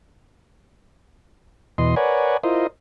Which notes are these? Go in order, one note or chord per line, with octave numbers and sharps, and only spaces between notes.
E2 B2 D#5 C6
A#4 B4 C#5 D5 F#5 G#5
E4 F4 A#4 C5 D#5